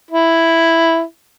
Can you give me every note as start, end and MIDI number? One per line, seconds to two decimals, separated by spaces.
0.11 1.03 64